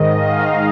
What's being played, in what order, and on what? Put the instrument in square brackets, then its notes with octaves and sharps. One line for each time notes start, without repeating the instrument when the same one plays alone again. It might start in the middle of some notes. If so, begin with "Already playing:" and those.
Already playing: [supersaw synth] G#2 D#3 D#5
F5